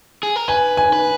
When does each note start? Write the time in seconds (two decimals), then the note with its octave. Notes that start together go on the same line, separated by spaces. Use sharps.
0.23 G#4
0.36 A#4
0.48 B4 G#5
0.77 G#5
0.93 B4